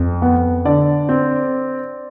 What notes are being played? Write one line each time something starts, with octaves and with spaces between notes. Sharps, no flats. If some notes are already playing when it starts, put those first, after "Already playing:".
Already playing: F2
B3
D3 D5
C4